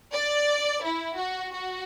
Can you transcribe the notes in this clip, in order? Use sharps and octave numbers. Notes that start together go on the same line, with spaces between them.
D5
E4
F#4
F#4